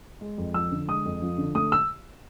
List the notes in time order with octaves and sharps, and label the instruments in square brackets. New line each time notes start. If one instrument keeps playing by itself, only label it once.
[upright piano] G#3
F2
F3 E6
D3
G#3 D#6
F2
F3
D3
A3 D#6
E6